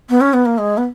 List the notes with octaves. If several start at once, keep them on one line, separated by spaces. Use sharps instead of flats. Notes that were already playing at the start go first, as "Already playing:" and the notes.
B3
C#4
B3
A#3
G#3
B3